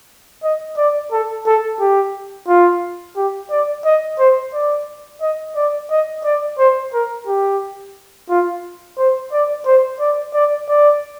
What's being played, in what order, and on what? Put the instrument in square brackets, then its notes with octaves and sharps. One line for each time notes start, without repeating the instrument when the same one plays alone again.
[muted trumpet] D#5
D5
A4
A4
G4
F4
G4
D5
D#5
C5
D5
D#5
D5
D#5
D5
C5
A#4
G4
F4
C5
D5
C5
D5
D5
D5